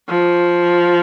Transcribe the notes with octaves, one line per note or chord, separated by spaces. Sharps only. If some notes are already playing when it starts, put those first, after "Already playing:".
F3